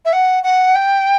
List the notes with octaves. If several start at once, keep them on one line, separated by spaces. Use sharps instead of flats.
E5
F#5
F#5
G5